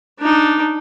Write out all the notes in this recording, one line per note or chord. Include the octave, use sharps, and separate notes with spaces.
D4 D#4